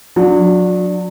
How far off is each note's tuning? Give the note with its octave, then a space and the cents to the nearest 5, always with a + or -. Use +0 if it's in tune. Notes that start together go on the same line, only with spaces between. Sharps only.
F#3 -30 D4 +0